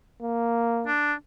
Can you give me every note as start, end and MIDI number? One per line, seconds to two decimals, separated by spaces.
0.22 0.91 58
0.87 1.14 62